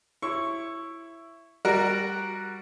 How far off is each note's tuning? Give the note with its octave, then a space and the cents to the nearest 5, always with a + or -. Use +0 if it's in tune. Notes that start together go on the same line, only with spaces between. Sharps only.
E4 +10 C#5 -20 C#6 +0
G3 +0 F#4 +0 A#4 +0